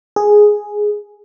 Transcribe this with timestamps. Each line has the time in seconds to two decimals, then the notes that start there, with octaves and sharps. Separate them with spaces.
0.16 G#4